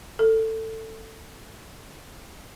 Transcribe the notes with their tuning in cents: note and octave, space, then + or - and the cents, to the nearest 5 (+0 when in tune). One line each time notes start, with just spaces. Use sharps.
A4 +20